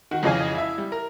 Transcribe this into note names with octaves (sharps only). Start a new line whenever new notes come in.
D#3 F#4 F#5
F2 C#3 E3 D#5 F5 G#5
E4 E5
G3
A#4